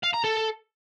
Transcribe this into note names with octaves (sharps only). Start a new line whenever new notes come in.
F5
A#5
A4